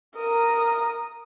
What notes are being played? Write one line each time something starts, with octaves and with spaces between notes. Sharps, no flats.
A#4 D#6